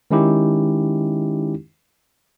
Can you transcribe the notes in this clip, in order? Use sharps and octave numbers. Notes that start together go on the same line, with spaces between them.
D#3 G#3 C#4 D#4 E4 G4